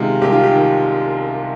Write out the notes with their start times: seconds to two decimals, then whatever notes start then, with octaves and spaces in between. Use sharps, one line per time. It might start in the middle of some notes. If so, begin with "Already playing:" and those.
Already playing: C3 D#3 G#3 F4
0.22 C2 G4
0.32 F4
0.44 G4
0.52 D#3